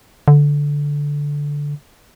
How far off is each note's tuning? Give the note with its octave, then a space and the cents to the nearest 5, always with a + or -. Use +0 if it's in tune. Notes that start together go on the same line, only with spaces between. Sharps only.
D3 -10